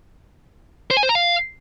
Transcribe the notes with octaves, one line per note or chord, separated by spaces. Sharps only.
C5
G#5
C5
A#5
F5